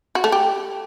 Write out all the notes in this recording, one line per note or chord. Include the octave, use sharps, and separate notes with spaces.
F#4
A3
G4